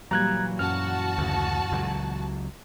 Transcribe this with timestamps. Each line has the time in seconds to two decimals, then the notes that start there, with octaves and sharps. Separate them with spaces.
0.11 A#2 E3 F#3 G3 A#5 F#6 G#6
0.59 F#2 F#4 A5 F6
1.18 D2 C#3
1.71 C#2 F#3